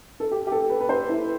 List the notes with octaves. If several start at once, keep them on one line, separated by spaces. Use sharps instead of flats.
A4
G4
G4
A4
B4
B4
C5
E4